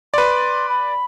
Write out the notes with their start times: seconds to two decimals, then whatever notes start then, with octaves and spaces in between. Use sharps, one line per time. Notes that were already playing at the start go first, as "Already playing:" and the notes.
0.14 B4 D5 C6
0.69 B5